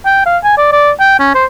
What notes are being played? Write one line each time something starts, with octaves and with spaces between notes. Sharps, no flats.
G5
F5
G#5
D5
D5
G5
C#4
C5